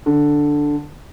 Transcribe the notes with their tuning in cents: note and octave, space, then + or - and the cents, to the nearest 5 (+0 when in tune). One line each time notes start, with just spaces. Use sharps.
D3 +0